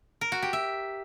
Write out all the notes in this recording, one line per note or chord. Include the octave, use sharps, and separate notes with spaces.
A#4
F#4
G4
E5